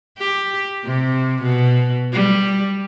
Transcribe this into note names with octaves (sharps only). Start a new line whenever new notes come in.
G4
C3
B2
G3